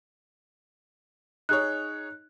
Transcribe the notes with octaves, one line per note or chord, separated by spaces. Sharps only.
D#4 G#4 C#5 F#6